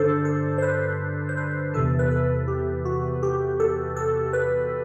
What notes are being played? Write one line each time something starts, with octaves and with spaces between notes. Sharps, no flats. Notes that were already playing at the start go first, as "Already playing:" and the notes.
Already playing: G2 D3 D4 A4 C5
A4
C5
B4
C5
B4
E2 C3 E3 A4
B4
A4
G4
F#4
G4
A4
A4
B4